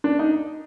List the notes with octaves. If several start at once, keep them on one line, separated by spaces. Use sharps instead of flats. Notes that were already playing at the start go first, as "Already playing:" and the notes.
D4
D#4